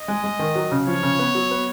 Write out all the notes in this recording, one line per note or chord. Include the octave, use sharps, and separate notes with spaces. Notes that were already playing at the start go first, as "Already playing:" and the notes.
Already playing: D#5
G#3
G#3
D#3
F#3
C#3
F3 C#5
C#3
B3
F#3
B3